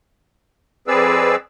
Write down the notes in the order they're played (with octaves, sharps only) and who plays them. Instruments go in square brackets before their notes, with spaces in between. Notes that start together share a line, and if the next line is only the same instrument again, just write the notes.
[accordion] F2 C4 G#4 B4 D5 E6